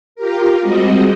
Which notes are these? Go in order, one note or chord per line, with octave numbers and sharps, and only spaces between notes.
F4 G4 A#4
G3 G#3 C4 F#4 D#5